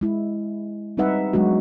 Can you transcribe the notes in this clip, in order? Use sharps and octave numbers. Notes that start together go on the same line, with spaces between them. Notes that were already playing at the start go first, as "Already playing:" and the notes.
G#3 E4
G3 C4 D#4 B4 E5 F#5
F#3 G#3 B3 D4 F#4